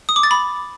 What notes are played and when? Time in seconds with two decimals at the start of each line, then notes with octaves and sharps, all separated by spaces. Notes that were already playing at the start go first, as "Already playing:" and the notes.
0.09 D#6
0.16 D6
0.23 A6
0.31 B5